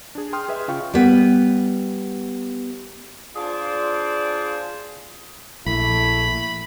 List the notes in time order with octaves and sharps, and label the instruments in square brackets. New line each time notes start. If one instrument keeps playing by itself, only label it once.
[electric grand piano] D4 G#4
G5 C6 D#6 F6
G#4 B4 D#5 E5
C#3 F4 F5 G5 C#6
[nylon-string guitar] G3 B3
[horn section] D4 F4 G#4 C5 D5
[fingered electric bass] A#1 [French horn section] A3 E4 [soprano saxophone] B5